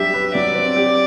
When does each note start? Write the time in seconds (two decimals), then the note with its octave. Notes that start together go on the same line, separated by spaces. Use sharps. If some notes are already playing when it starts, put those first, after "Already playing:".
Already playing: F#3 G3 D4 G4 E5
0.14 B4
0.34 F#3 D5
0.55 C4
0.76 G4